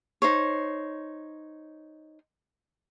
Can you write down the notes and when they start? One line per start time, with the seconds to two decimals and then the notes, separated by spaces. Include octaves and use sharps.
0.22 D#4 C5 C#5